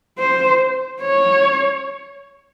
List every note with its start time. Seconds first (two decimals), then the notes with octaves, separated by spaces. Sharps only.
0.19 C5
1.02 C#5